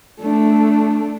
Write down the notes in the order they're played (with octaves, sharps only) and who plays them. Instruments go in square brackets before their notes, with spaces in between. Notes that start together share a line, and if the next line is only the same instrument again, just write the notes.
[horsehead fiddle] A3 D4